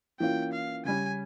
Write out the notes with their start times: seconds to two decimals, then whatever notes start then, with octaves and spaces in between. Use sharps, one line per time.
0.20 E3 A#3 C#4 F4 G5
0.53 F5
0.85 C#3 G3 C#4 G#5